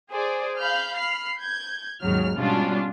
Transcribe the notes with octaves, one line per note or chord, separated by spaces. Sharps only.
G#4 C5 D5 G#5
F5 B5 F6 G6
B5 F6 C7
G6 G#6
D#2 G#2 C#3 F#3 F6
G#2 B2 G3 C#4 D4 F4